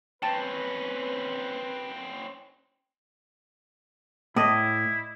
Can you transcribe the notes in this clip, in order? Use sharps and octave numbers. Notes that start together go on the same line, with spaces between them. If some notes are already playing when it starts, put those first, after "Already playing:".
C4 C#4 B4 G5 A5 A6
A2 E4 D5 D#5